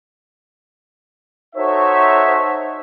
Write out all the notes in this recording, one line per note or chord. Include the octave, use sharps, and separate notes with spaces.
D#4 F#4 A4 C5 C#5 E5